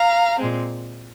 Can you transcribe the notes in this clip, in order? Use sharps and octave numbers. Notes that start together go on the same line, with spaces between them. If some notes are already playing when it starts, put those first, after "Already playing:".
Already playing: F5 A#5
A#2 G#3 C4